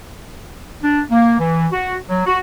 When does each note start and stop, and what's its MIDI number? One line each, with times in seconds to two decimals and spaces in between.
0.82 1.00 62
1.10 1.36 58
1.39 1.67 52
1.72 1.95 66
2.09 2.23 54
2.26 2.38 66